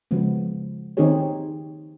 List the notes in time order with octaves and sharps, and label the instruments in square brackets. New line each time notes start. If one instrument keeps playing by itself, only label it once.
[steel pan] C#3 F3 G#3 B3
D#3 C4 D#4 G4 G#4 C#5